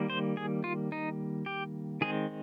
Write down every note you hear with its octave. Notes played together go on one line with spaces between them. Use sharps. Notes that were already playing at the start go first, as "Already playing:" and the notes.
Already playing: D#3 G3 A#3
C5
G#4
F4
D#4
G4
D#3 G#3 C4 G#4